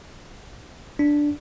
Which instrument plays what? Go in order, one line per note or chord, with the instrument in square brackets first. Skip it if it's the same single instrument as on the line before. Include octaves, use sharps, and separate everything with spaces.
[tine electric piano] D4